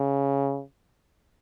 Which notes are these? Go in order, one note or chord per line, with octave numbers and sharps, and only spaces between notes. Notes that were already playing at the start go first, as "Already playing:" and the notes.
Already playing: C#3